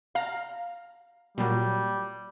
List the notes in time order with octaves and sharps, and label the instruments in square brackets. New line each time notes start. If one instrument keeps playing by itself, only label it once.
[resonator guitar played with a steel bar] F5 [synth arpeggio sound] A#5 F6
[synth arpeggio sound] A#2 F#3 [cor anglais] G3